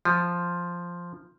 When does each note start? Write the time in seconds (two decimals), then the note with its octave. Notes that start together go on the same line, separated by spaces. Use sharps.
0.05 F3